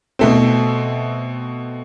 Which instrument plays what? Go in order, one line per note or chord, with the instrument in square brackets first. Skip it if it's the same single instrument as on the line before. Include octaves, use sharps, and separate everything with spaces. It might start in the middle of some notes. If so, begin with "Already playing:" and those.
[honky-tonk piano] B2 A3 C4